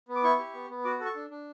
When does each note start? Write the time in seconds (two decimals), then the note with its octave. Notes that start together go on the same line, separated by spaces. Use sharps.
0.09 B3
0.16 D6
0.24 E4 C#6
0.39 G4
0.54 B3
0.70 B3
0.85 F#4 D6
1.00 A4
1.05 C#6
1.15 D4
1.30 D4